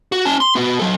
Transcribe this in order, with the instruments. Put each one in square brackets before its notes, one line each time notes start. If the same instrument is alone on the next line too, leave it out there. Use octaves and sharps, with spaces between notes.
[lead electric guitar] F#4
C#4 A5
C6
B3 F#4
F#3 A4